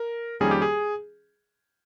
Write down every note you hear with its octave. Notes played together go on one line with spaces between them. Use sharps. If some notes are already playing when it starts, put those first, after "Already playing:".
Already playing: A#4
F2 D#3 G3 A#3 C#4 G#4
G4
G#4